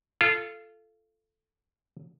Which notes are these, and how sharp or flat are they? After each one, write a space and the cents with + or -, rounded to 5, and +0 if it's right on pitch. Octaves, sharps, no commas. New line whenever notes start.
F4 -20 A4 +0